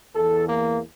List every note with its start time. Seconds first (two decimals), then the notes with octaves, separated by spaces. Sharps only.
0.14 E2 E3 A4
0.48 A#3